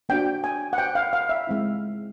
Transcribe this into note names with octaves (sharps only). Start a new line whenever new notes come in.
A#3 D4 F#4 G5
G#5
F#5
G5
F5
F5
E5
G#3 C4 E4